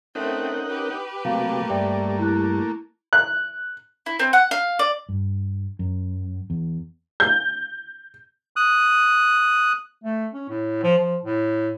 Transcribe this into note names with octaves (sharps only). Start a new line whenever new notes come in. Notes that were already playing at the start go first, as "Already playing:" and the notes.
A3 C4 C#4 D#4 A#4 F#5 G5
G4 B4
C3 F#3 A3 A#3 F5
G2 G3 D5 E5 G5
E4 F#6
F#6
E4
C4
F#5
F5
D5
G2
F#2
E2
G6
D#6 F#6
A3
C#4
A2
F3
F3
A2